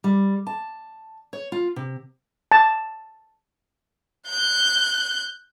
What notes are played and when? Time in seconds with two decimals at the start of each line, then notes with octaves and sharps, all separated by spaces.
0.04 G3
0.47 A5
1.33 C#5
1.52 F4
1.76 C3
2.51 A5
4.28 F#6 G6